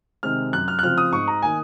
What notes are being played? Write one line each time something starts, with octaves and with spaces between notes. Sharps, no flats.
C3 D#3 G#3 C4 F6
F#2 F#6
F6
F#6
C#3 F3 C4 F4 F6
D#6
G#2 C#6
A#5
D#3 A#3 G#5